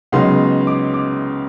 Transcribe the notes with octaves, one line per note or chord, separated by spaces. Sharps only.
C#2 C#3 F#3 B3 D#4 C6
D6
D6